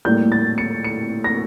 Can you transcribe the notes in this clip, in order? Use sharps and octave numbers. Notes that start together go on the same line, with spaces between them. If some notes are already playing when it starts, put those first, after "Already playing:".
A2 G3 A#3 G6
A6
C#7
C#7
A#6